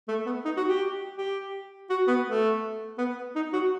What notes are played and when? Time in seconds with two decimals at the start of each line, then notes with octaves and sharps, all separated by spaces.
0.08 A3
0.26 B3
0.45 D#4
0.57 F#4
0.69 G4
1.18 G4
1.90 F#4
2.07 B3
2.27 A3
2.98 B3
3.35 D#4
3.53 F#4